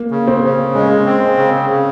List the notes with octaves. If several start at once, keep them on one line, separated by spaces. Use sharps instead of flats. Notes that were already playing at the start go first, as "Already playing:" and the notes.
Already playing: A#3
C#3
C4
C#3
G#3 C#4
C4
C#3
C#3